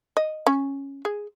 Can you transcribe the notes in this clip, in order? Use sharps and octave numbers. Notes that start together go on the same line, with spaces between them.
D#5
C#4
G#4